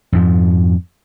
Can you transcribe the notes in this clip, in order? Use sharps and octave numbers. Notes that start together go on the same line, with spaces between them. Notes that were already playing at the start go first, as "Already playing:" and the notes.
F2 G#2 F3